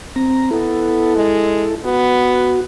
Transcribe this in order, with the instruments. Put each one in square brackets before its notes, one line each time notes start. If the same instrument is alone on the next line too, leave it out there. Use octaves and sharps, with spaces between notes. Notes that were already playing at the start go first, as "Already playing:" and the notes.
[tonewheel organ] C4 A#5
[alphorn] B3 [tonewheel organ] E4 A4
[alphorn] G#3
[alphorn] B3 [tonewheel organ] F#4